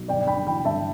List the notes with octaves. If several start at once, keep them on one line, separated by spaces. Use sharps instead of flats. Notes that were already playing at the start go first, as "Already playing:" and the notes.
Already playing: B1
G1 D5 G5
G2 G5 B5
E3 G5 B5
G1 E5 A5